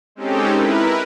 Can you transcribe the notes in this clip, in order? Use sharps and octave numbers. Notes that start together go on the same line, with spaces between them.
G#3 C4 C#4 D#4 G4 A4
E4 A#4 B4